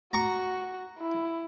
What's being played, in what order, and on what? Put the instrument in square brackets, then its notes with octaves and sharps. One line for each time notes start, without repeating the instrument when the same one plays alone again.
[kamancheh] F#4 [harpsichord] A#5 C#6
[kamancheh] E4